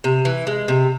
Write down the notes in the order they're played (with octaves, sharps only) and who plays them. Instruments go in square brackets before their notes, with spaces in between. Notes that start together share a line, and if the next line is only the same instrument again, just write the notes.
[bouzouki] C3
E3
G#3
C3